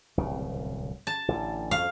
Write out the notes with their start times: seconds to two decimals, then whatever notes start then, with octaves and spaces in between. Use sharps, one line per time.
0.18 D1 C2 C#3
1.07 A5
1.28 A1 D3
1.71 F2 F5